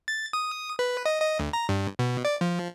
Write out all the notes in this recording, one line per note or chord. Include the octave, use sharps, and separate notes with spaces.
A6
D#6
B4
D#5
D#5
D2
A#5
G2
B2
D5
F3